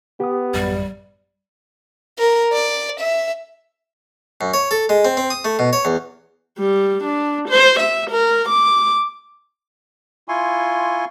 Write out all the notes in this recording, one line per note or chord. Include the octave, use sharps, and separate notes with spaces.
B3 G4 D#6
A1 F#2 G3
A#4
D5
E5
F#2
C#5
A4
G#3
C4
C4
D#6
A3
B2
C#5
E2
G3
D4
C5
E5
A#4
D6
E4 F4 G#5 C6 C#6